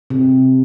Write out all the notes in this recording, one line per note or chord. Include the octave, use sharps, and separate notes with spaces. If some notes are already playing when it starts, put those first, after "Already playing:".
C3